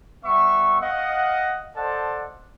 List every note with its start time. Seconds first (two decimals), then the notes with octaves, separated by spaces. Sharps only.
0.24 G3 B3 E5 C#6
0.81 D#5 F5 F#5
1.76 A4 C5 D5 D#5 F#5 A5